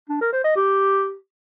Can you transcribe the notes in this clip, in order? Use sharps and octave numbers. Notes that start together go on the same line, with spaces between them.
D4
A#4
C5
D#5
G4